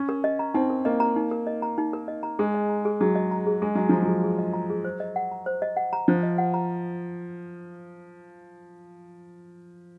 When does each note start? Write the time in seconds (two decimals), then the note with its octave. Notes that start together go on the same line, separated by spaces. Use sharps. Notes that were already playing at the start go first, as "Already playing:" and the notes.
Already playing: C#4
0.09 A#4
0.24 D#5
0.39 A#5
0.54 C4 D#4
0.70 A#4
0.85 A#3 D#5
1.00 A#5
1.16 D#4
1.31 A#4
1.47 D#5
1.62 A#5
1.78 D#4
1.93 A#4
2.08 D#5
2.23 A#5
2.39 G#3 G#4
2.54 D#5
2.69 A#5
2.85 G#4
3.01 F#3 G#4
3.15 D#5
3.31 A#5
3.47 G#4
3.62 G#3 G#4
3.75 F#3 D#5
3.89 F3 A#5
4.02 F#3
4.08 G#4
4.23 G#4
4.39 D#5
4.53 A#5
4.70 G#4
4.85 C5
5.00 D#5
5.16 F#5
5.32 A#5
5.46 C5
5.62 D#5
5.77 F#5
5.93 A#5
6.08 F3 C5
6.23 D#5
6.38 F#5
6.54 A#5